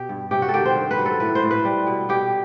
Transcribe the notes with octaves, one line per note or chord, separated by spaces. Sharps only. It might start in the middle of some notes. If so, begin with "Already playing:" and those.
Already playing: B2 G4
G2
C3 G4
F#4
A4
D#3 G4
C5
G2
B4
F#3
A4
A2 B4
C5
A2
B4
G3
B2
B2 G4